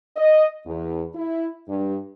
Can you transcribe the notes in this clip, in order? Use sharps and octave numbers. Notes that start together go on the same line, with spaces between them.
D#5
E2
E4
G2